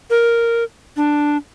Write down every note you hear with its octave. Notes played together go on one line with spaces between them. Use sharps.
A#4
D4